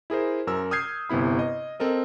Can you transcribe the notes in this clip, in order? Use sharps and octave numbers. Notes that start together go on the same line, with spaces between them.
E4 G#4 A#4 C5
F#2 A#4 E6
D#6 F6 G6 G#6 C7
G1 C3 B3 E4 B5
D#5
C4 A4 A#4 D#5